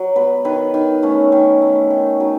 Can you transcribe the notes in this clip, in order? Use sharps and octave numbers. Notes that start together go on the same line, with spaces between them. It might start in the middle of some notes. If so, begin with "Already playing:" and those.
Already playing: F#3
B3 B4
D#3 B4
D#3
A3 C#4
D#3
A3
D#3
F#3 D#4